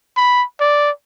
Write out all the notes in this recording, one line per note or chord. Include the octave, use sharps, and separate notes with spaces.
B5
D5